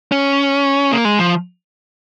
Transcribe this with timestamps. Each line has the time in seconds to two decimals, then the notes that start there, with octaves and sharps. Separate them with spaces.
0.12 C#4
0.92 A#3
1.05 G#3
1.19 F3